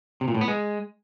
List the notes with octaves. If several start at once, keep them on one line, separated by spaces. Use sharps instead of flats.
C3
A#2
A2
B3
G#3